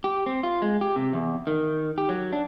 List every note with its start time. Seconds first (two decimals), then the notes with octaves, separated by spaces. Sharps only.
0.04 G4
0.26 C4
0.43 F4
0.62 G#3
0.81 G4
0.96 C3
1.13 E2
1.47 D#3
1.98 G4
2.09 F#3
2.33 D4